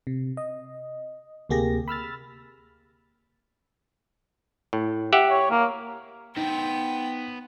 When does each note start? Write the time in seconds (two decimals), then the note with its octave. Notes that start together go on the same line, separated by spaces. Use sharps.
0.07 C3
0.37 D#5
1.49 D2 C3 A#3 G4 G#4 A#6
1.88 B5 E6 F6 A6
4.73 A2
5.13 G4 E5 F#5
5.30 C#5
5.51 A#3
6.36 B3 D#4 C5 G5